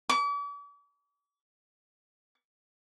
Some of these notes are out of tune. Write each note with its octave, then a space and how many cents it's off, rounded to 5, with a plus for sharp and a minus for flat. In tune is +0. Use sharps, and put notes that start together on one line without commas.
D6 -45